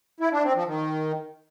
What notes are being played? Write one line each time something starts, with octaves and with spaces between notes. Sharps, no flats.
E4
D4
C4
F3
D#3